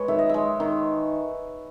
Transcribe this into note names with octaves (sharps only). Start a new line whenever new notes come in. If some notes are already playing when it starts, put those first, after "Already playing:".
Already playing: G#3 B4 C#5
D#3 E5
D#5
G#3 E5
D#3